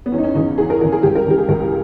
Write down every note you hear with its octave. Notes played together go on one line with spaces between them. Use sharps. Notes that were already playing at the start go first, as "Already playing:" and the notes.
B3
E2 C#4
D#4
C#4
C#3 E3 D#4
E2 G#4
A#4
C#3 E3 A#4
G#4
C#2 G4
A#4
C#3 E3 G4
G#4
C#2 A#4